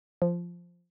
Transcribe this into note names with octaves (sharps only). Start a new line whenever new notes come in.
F3